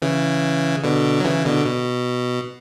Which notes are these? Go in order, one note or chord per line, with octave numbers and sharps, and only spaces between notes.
C#3 E3
B2 D3
F#3
C#3 E3
B2 D3
B2